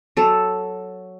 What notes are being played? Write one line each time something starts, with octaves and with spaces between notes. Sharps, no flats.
F#3 A4